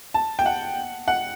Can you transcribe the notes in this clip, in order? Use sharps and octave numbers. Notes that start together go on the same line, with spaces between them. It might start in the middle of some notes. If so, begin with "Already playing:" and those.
A5
G5
F#5
F#5